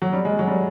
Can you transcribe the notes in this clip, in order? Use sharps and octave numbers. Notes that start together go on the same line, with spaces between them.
F#3
G3
G#3
F#3
G3